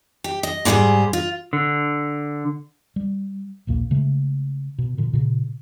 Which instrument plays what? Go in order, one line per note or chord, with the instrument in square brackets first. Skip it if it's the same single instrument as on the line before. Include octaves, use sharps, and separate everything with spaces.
[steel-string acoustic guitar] G4
D#5
G#2 G3 E4 F#4 G#4 C5
F4
[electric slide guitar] D3
[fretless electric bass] G3
A#1 D#2 A#2 A#3
C#3 G#3 A3
B2
A#2 D3 F3
A#2 C#3